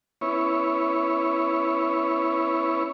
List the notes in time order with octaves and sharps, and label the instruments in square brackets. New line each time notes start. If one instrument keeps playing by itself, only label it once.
[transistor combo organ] B3 C#4 E4 C#5